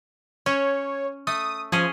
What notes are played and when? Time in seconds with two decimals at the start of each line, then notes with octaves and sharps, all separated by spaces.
0.46 C#4 C#5
1.27 A3 D#6
1.72 F3 C#4 G#4